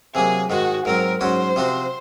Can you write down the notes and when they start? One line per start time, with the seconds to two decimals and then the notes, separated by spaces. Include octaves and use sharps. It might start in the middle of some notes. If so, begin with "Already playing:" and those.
0.14 C3 F#3 A#3 G#4
0.50 G#2 D#3 G#3 F#4
0.85 G#2 F#3 C4 A#4
1.20 G#2 F#3 C#4 F#4 C5
1.56 C3 F3 C4 F#4